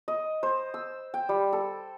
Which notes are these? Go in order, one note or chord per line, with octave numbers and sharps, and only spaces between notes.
D#5
C5
E6
G5
G3
A4